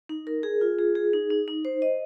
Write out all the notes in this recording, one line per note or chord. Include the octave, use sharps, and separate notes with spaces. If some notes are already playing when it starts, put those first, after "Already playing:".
D#4
A#4
G#4
F4
G#4
G#4
D#4
D#4
D#4
C5
D#5